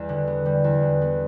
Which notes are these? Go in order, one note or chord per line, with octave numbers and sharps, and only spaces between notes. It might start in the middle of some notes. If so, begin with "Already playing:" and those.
Already playing: E2 G3 B3
D3
B3
G3
E2
D3
B3